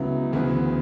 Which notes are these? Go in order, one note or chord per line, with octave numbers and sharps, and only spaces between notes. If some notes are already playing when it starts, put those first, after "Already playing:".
Already playing: C#2 C#3 F#3 B3 E4
D2 C#3 E3 B3